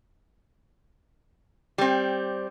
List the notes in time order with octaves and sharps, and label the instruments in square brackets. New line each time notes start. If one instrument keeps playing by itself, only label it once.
[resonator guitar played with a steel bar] G3 C4